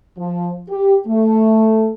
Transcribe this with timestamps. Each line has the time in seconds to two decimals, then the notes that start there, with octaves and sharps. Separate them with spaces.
0.18 F3
0.70 G4
1.07 A3